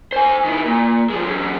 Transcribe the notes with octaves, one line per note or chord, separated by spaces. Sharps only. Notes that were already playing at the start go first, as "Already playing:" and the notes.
C5 G#5
D#3 E4
A#2
F3 G#3
E2 F#3